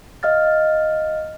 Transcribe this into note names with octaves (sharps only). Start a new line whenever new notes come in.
D#5 F5 F6 A6